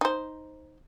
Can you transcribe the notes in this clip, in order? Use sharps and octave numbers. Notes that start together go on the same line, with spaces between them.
D#4 C5